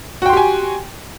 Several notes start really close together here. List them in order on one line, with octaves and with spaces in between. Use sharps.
F#4 G5 C6 G4 G#5